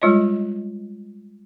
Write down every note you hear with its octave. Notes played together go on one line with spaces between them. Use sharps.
G3 G#3 F4 C#5 D#5